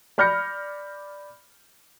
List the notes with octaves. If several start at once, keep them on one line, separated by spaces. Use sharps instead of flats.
D5 B5 F6 G6 A#6 C#7